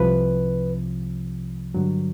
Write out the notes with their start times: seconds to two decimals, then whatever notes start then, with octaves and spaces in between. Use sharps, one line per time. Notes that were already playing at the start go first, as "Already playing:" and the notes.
Already playing: C2 C3 F3 B4
1.74 G2 D3 F#3